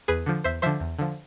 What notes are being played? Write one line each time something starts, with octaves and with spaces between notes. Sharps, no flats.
E2 G#4 B4
D3 F3
E2 C5 E5
D3 F3 C5 E5
E2
D3 F3